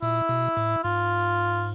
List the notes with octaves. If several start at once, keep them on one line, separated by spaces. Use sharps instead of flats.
A#2 E4
B2
A2
G#2 F4